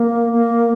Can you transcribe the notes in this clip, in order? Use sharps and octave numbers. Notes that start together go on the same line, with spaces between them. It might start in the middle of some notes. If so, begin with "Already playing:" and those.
Already playing: A#3
A#3